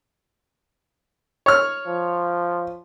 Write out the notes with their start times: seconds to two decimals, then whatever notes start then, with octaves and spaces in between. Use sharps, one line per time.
1.46 C#5 F6
1.87 F3